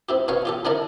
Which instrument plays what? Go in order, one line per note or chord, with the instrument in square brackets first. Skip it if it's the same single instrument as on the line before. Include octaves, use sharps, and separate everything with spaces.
[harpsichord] C4 E4 G4
B2 C#4 B4 C#5 F5 C#6
F4 G4 A4
D3 C#4 D4 E4 A#4 A5